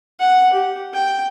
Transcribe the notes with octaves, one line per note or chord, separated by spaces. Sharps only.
F#5
G4
G5